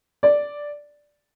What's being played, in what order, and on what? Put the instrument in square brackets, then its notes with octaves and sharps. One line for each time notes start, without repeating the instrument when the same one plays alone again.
[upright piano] D5